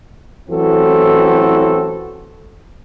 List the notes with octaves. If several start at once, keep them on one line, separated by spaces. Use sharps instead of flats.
A1 E3 F#3 C4 F#4 A4